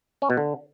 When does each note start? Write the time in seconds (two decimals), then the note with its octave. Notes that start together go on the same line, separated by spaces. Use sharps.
0.22 C#4
0.30 B2
0.37 D3